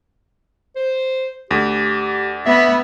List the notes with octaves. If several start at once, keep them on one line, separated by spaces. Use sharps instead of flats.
C5
D2 G4
B3 E5